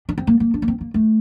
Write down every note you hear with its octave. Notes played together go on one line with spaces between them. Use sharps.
D4
C4
A#3
A#3
D4
A#3
C4
A#3
A3